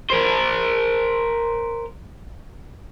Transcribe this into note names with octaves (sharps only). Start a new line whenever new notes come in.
A#4 C5